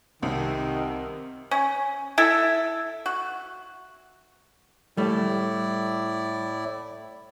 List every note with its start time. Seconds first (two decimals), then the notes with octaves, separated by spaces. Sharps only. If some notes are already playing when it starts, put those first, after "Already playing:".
0.22 C2 C3 D#3
1.51 C#4
2.18 E4 A4 E5
3.06 F#4
4.97 A2 G3 A3 E4 D5